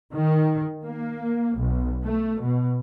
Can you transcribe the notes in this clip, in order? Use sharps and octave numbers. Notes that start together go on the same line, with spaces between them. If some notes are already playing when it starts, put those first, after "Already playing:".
D#3
A#3
B1
A3
B2